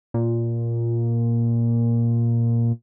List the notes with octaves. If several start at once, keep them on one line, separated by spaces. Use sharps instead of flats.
A#2